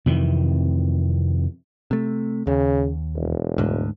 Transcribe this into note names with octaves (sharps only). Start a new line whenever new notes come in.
F2 C3 D#3 E3
C3 A3
D#2 C#3
E1
D2 G#2